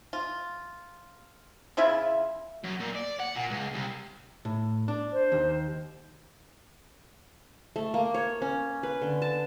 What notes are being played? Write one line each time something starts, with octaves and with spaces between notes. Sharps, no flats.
F4
C#3 E4 F4 E5
F#2
A#2
D5
F#5
A#2
C#2
C2
A2
D4
C5
D#2
A3
A#3
C#5
C#4
B4
D3
A5